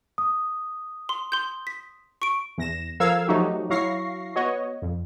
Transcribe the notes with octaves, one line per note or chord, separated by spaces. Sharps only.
D#6
C6
C6 G6
B6
C#6 D7
E2 A#6 E7
F3 A4 A#4 F5 E6 G#6
F3 F#3 A3 D#4 F#4 G4
F#3 E4 F5 C#6 A#6 C7
B3 F#4 C#5 D#5
F2